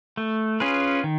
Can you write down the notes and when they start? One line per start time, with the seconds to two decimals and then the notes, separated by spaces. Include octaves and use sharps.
0.17 A3
0.60 C#4 F4 G#4 B4
1.04 D#3